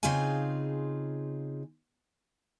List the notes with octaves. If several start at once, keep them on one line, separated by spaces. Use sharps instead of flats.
C#3 C4 D#4 F4 G#4 G#5